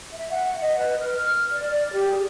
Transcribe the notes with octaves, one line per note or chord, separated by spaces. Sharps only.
E5
F#5
D#5
B4
F6
D5
D5
G4
G#4